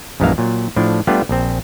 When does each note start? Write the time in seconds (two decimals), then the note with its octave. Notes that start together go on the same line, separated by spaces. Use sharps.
0.20 A#1 F#2 E3 G#3 A#3 F5
0.38 A#2 F#3
0.76 A2 F3 D4
1.07 G3 A3 B3 D4 F4 G4
1.29 A#1 C4